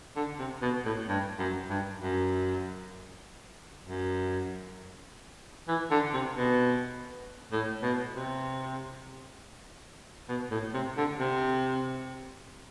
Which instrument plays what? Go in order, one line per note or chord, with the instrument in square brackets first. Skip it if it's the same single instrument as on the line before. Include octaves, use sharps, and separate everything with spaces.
[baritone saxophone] D3
C3
B2
A2
G2
F#2
G2
F#2
F#2
E3
D3
C3
B2
A2
B2
C3
B2
A2
C3
D3
C3